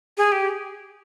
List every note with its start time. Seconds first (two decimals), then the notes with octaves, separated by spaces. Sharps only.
0.17 G#4
0.32 G4